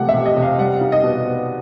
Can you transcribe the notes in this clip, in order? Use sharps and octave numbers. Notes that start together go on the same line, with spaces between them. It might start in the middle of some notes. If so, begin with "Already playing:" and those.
Already playing: C3 F3 A3 F#5
E5
C3
D#5
C3
F5
G3 F#5
F5
D#4
D#5
B2
B3